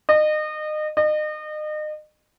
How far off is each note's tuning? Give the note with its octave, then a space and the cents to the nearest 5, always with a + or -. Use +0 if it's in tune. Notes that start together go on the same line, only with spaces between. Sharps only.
D#5 -30
D#5 -35